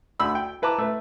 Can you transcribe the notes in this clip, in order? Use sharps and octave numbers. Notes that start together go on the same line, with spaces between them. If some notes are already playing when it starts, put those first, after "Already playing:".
D2 B5 E6
G5
E4 B4 A5 A#5 D6
A3 B4